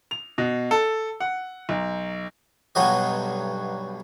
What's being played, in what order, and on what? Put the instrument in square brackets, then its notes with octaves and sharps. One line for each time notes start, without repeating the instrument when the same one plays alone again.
[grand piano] F7
B2
A4
F#5
B1
[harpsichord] B1 G2 F#3 F#4 D#5